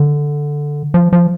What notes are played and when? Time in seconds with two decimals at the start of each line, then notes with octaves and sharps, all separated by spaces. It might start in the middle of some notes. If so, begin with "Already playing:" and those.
Already playing: D3
0.94 F3
1.13 F3